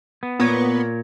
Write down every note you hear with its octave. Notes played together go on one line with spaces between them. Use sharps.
B3
A#2 B3 A#4 C#5